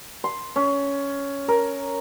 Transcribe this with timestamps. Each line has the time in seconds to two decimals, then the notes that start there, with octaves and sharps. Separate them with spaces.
0.24 C6
0.56 C#4
1.48 A#4